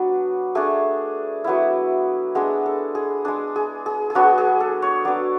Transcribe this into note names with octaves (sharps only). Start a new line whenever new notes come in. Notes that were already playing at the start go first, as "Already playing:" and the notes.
Already playing: F#3 B3 D4
A3 D4 G#4
F#3 B3 E4
G#3 B3 D4 G#4
A4
G#4
G#3 D4 G#4
G#4
G#4
G#4
F#3 B3 D4 F#4
G#4
A4
C#5
F#3 B3 D4 D5